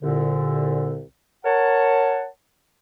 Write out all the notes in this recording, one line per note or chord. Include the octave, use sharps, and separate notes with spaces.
C2 A#2 D3
A#4 C#5 F#5 A5